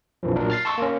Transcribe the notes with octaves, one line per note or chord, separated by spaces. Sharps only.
B1 F#2 E3 F3
A#2 F#3 D4 A#4
F6 A6 C7
A5 C6 C#6 E6
A#3 C#4